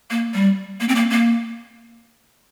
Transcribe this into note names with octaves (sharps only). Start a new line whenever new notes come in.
A#3
G3
A#3
C4
A#3
A#3